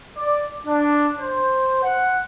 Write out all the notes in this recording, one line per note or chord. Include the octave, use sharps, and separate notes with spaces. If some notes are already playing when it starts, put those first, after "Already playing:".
D5
D4
C5
F#5